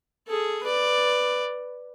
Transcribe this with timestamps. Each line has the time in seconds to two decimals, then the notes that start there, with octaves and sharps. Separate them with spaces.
0.28 G#4 A4
0.63 B4 D5